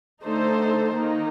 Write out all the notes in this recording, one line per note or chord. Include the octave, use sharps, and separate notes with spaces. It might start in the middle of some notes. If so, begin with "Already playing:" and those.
D3 A3 D#4 A4 C5
D#3 A#3 D#4